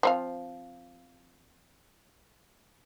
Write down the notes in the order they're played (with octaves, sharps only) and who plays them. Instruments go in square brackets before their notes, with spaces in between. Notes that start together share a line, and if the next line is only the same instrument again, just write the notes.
[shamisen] F3 C4 F5